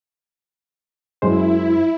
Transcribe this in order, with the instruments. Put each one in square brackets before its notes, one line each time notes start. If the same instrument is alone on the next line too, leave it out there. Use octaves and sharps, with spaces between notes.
[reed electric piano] F#2 G#3 C5 [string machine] E4